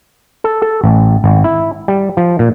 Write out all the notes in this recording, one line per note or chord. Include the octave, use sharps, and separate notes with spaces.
A4
A4
A1
G#1
E4
G3
F3
A#2